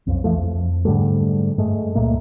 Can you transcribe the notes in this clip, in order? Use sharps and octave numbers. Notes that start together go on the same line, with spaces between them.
B1 F2
E3 F3 A3
F2
G#2 D3 G3 A3
G2 G#3 A3
C#2 A#2 A3 A#3